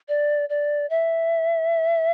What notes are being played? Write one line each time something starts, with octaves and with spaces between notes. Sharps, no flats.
D5
D5
E5